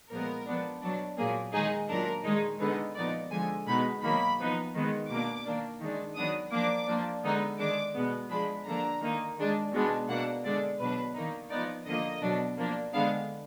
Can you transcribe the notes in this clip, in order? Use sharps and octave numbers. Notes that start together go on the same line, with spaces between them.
A#2 F3 G#3 B3 A#4
F3 B3 D4
B2 F#3 D4
A#2 F#3 A#3 G#4
D#3 G#3 D#4 G#4
A#2 F#3 D4 A#4
D#3 G#3 D#4
D3 G#3 B3 D#4 B4
A#2 F3 B3 D#4 D5
D3 F3 G#3 G#5
B2 G#3 B3 D#4 B5
D#3 F#3 A#3 B5
F3 B3 D#4
D#3 G#3 B3
B2 A#3 D4 D6
D#3 A#3 D4
D#3 G#3 D4
D#3 F#3 B3 D4 D#6
F3 A#3 D4 D6
F3 A#3 D4
D3 G#3 B3 D#4
D#3 G#3 D4 D6
B2 G#3 B3
F3 G#3 D4 B5
D3 F3 A#3 D4 A#5
D#3 A#3 D#4
D#3 G#3 D4
B2 G#3 B3 D4
B2 A#3 D4 F#5
D3 G#3 D4 D5
B2 F#3 D4 B4
D#3 A#3 D#4
F3 B3 D#4 D5
D3 F3 A#3 D#5
B2 F#3 D4
F3 A#3 D4
D3 G#3 B3 D4 F5